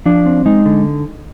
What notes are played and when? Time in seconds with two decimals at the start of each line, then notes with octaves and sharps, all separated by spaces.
0.06 F3 D4
0.26 C4
0.46 G#3 D#4
0.66 D3